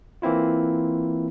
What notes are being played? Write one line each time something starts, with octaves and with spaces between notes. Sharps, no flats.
E3 A#3 C4 E4 F4